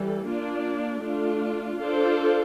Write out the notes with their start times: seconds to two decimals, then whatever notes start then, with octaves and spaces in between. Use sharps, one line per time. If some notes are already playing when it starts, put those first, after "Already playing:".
Already playing: E3 G3 A4
0.26 A#3 D4 F4
1.03 A3 D4 F4
1.80 D4 F4 A4 C5